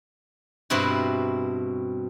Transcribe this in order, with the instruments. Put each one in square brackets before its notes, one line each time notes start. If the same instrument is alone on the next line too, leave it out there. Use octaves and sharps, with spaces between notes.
[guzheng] G2 B2 C4 E4 F#4